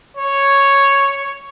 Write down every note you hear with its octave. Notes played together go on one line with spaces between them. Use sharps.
C#5